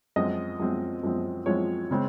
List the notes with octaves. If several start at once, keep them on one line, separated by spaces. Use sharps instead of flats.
F#2 F3 G#3 C4 D#5
F#2 F3 G#3 C4
F#2 F3 G#3 C4
F#2 F3 G#3 C4 C#5
C#3 G#3 C4